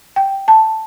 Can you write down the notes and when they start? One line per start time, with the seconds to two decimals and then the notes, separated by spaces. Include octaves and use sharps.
0.16 G5
0.48 A5